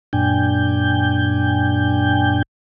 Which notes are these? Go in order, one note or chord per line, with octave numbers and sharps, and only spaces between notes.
F#2 A#2 D4 G5 G#5 G6